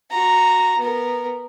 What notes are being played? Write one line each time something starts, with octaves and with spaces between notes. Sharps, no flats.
F#4 A#5
B3 A#4